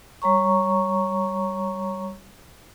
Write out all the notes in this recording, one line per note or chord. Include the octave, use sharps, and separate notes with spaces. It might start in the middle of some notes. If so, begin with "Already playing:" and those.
G3 C#5 A#5 C#6